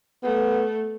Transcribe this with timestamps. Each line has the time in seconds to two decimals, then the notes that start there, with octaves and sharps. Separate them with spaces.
0.23 A3 B3